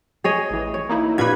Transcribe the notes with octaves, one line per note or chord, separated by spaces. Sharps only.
G#4 C#5 D#5
A1 E3
C#5
A#3 D#4 E4
G2 A#2 B4 B5 G#6